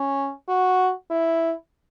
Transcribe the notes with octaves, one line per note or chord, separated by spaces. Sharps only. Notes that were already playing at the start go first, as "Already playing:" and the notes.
Already playing: C#4
F#4
E4